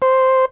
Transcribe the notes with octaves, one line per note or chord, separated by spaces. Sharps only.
C5